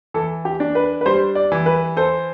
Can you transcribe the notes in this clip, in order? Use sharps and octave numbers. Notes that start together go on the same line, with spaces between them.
E3 A4
G4
D4
B4
B4
G3 C5
D5
E3
B4
A4 C5